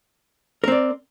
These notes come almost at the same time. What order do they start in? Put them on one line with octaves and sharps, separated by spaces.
A#4 C4 D5